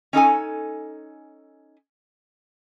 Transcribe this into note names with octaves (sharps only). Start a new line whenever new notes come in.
C#4 D#4 A4 G#5